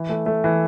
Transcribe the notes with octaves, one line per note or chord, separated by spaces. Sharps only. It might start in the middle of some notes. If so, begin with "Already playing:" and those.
Already playing: E3
A3
A3
E3